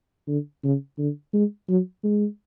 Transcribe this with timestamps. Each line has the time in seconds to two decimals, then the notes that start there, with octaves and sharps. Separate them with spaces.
0.28 D3
0.64 C#3
0.98 D3
1.33 G#3
1.69 F#3
2.04 G#3